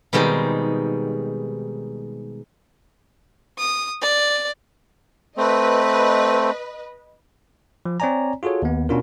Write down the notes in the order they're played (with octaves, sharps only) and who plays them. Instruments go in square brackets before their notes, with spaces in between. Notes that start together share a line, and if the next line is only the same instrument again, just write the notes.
[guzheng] B2 D#3 G3 G#3 C4 D#4
[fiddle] D#6
D5
[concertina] A3 C4 [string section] B4 D#5
[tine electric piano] F3
C4 C#5 D5 G#5 A#5
F4 F#4 G#4 A4 C#5
D#2 B3
B2 C#4 D4 F4 A#4